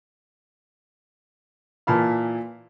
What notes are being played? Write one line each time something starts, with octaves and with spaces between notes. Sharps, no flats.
A#2 E3 A5 B5 F6